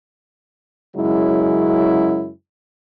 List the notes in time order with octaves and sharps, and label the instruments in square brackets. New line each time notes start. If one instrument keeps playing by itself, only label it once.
[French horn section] F#2 C#3 F#3 G#3 E4